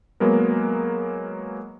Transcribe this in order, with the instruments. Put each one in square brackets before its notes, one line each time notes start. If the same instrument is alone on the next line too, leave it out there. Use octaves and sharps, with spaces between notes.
[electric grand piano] F#3 G#3 A#3 B3 A#4